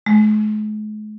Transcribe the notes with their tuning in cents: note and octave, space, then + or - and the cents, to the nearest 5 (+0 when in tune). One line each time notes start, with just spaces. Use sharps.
G#3 +45